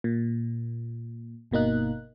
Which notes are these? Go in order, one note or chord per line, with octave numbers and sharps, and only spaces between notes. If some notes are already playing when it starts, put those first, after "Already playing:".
A#2
G1 B2 A#3 D#4 F#6